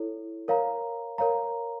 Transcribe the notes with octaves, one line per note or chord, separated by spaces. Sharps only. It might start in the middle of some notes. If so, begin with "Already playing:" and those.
Already playing: E4 A4 C#5
A#4 C#5 F5 A#5
A#4 C#5 F5 A#5